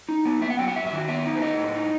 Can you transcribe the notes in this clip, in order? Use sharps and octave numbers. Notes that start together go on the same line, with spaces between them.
D#4
B3
B3 E5
F#5
F#3 G5
F#5
F#2 E5
E5
D#3 F#4
B3 E5
D#4
C5
A3 D#5
A2
D#4